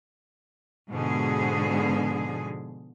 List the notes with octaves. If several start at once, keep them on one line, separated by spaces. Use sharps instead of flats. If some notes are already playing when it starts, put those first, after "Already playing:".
G#2 B2 D3 F3 G#3 G#4